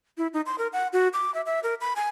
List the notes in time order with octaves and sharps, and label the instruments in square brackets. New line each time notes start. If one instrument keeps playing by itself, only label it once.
[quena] E4
D#4
C6
A#4
F#5
F#4
D6
E5
E5
A#4
B5
G#5